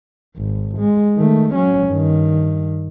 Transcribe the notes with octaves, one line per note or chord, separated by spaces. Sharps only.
G#1
G#3
D#3 A3
F#3 C#4
G2 D#3